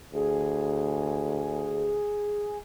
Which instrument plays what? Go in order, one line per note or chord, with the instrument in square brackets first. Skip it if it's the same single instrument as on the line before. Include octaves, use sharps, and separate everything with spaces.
[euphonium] D2 [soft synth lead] G#4